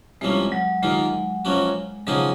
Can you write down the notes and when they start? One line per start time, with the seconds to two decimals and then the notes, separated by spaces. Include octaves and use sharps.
0.21 C2 C3 F3 G#3 A#3 C#4
0.52 F#3
0.82 D#2 D#3 G#3 A#3 F4
1.45 F#2 F3 A#3 C#4 F#4
2.07 C#3 F3 F#3 A#3 D#4 G#4